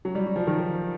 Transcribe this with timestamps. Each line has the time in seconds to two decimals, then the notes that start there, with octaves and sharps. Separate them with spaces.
0.05 F#3
0.15 G3
0.26 F#3
0.36 F3
0.47 D#3